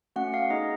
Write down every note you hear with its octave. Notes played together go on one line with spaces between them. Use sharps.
A3 C#4 F#4 F#5
F5
B3 D#4 G#4 D#5